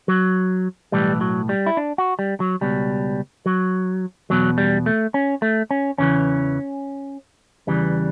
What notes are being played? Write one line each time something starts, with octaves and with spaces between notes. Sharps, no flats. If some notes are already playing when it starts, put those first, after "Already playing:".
F#3
B1 A2 E3 G3
F#3
G3
E4
D4
F#4
G3
F#3
C#2 B2 G3
F#3
E2 B2 F#3
G3
A3
C#4
A3
C#4
E2 C#3 E3 C#4
E2 C#3 E3 G3